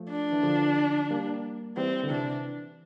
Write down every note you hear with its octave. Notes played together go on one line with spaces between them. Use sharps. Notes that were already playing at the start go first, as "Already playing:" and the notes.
Already playing: F3 A3
D4
E3
D3 F3
G3 A#3
E3 G3 C4
D3
C3 E3 D4